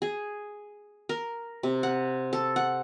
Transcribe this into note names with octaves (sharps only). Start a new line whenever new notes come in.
G#4
A#4
C3
F#5
A4
F#5